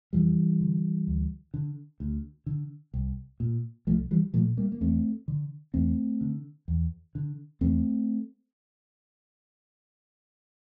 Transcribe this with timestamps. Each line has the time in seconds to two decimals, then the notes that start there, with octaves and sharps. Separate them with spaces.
0.13 F2 E3 G3
0.60 D3
1.07 D2
1.54 D3
2.00 D2
2.46 D3
2.94 C2
3.40 A#2
3.87 C2 F3 A3
4.11 E3 G3
4.34 A#2 F3 A3
4.57 G3 A#3
4.72 A#3
4.81 E2 A3 C4
5.28 D3
5.74 E2 A3 C4
6.21 D3
6.68 E2
7.15 D3
7.61 E2 A3 C4